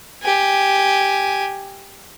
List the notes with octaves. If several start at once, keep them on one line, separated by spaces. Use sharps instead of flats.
G4 G#5